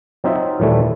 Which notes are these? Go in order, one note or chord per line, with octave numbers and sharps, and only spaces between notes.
F#3 C4 D#4 F4 E5
D#2 A#2 E3 G3 A3